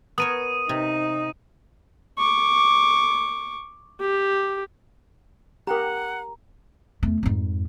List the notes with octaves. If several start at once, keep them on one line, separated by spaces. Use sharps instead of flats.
B3 A#4 C#5 D#6 D#7
C3 D#4
C#6 D6
G4
G4 A#4 F#5 A#5
E2 A3
F2 G#2